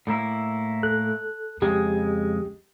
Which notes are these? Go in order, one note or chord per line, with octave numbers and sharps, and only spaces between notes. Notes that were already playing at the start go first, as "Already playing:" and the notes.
A2 A#3 E4
A4 F#6
F2 C#3 G#3 G4